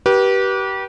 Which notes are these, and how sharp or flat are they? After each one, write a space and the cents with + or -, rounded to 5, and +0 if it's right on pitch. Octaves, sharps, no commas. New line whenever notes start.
G4 -25 B4 -35